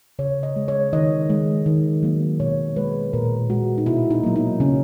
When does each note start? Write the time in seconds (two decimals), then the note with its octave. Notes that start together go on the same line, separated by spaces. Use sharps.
0.19 C#3 C#5
0.43 D#5
0.56 G#3
0.68 C#5
0.93 D#3 D#5
1.30 G#3
1.66 D#3
2.03 F#3 A#3
2.40 B2 C#5
2.76 G#3 B4
3.13 A#2 A#4
3.50 G#3 F#4
3.78 D#4
3.86 B2 E4
4.11 D#4
4.24 F#3 A#3
4.36 D#4
4.60 C#3 C#4